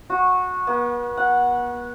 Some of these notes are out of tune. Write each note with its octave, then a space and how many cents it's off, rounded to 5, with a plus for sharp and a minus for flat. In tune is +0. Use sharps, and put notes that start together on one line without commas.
F#4 -15
B3 -40
F#5 -10